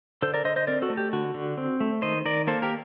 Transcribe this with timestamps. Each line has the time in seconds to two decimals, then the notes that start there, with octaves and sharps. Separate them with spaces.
0.22 D3 A4 C5
0.34 A#4 D5
0.44 D3 C5 D#5
0.56 C5 D#5
0.67 C4 A#4 D5
0.82 F#4 A4
0.90 A3
0.97 G4
1.13 D3 F#4
1.34 D3
1.58 C4
1.80 A3
2.02 D#3 C5 D#5
2.25 D#3 A#4 D5
2.47 A#3 A4 C5
2.62 G4 A#4